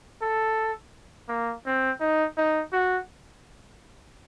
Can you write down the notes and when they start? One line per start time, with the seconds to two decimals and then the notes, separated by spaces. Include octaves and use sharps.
0.22 A4
1.29 A#3
1.66 C4
2.00 D#4
2.37 D#4
2.73 F#4